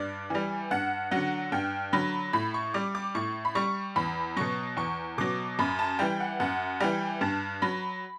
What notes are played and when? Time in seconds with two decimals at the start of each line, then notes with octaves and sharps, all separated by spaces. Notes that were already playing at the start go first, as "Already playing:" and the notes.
Already playing: G2 D5
0.30 E3 G3
0.71 G2 F#5
1.11 D3 F#3 F#5
1.52 G2 G5
1.93 D3 F#3 B5
2.33 A2 B5
2.54 C#6
2.74 G3 D6
2.95 D6
3.15 A2 C#6
3.45 B5
3.55 G3 C#6
3.96 E2 B5
4.37 B2 F#3 C#6
4.77 E2 C#6
5.18 B2 F#3 D6
5.59 F#2 B5
5.79 A5
5.99 E3 G3 G5
6.20 F#5
6.40 F#2 F#5
6.80 E3 G3 G5
7.21 G2 A5
7.62 F#3 B5